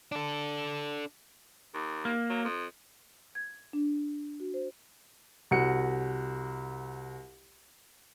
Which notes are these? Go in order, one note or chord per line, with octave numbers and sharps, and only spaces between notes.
D4 A4
D#2
A#3
F#3
F2
G#6
D4
F#4
C5
C2 F#4 C#7